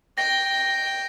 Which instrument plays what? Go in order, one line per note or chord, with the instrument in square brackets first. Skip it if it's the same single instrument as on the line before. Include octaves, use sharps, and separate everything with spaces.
[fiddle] G5 [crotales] A#6